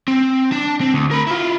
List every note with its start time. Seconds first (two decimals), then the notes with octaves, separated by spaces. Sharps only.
0.08 C4
0.52 D4 A5
0.81 C4
0.94 D2
1.11 A#4 B5
1.27 E4 F4